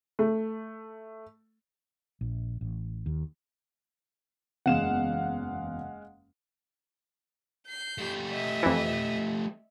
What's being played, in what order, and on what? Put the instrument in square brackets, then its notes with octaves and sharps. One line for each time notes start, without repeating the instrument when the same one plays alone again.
[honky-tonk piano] A3
[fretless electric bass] A#1
A1
D#2
[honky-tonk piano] F#1 E2 E7 [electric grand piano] G#3 F5 F#5
[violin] G6 C7
[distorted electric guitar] A3 G4
[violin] D#5 E5
[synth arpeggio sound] F2 E3